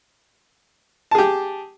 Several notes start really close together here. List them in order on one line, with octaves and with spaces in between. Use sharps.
A5 G#4 G4